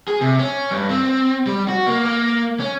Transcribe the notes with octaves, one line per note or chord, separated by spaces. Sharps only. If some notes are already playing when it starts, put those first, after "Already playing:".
G#4
C3
C#4
G2
C4
G3
F#4
A#3
A#3
C#4